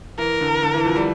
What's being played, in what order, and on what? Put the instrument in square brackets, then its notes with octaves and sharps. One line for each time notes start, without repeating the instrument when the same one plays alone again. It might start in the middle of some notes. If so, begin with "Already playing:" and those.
[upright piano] E3 [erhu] A#4
[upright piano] D3
D3
E3
F2 F3
G3